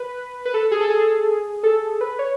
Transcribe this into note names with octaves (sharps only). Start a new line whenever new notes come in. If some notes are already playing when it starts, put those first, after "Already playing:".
Already playing: B4
B4
A4
G#4
A4
G#4
A4
B4
C#5